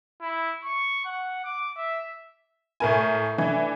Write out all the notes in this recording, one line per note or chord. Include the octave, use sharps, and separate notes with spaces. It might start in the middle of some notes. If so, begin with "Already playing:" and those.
E4
C#6
F#5
D6
E5
A2 A3 E4 A#4 G#5
E3 D4 E4